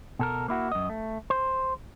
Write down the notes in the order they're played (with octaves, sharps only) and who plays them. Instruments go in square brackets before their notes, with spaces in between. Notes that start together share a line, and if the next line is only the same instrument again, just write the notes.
[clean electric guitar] B2 A4 A#4
A#3 E4 F#4
F#2 D#5
A3
C5